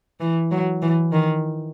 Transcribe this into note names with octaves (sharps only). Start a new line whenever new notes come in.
E3
F#3
E3
D#3